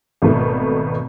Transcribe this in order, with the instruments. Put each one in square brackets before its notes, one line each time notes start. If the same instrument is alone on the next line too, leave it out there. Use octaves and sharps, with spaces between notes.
[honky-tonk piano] G#1 B2 A3